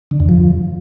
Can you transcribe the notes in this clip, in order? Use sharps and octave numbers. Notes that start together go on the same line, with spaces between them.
D3
E2
F3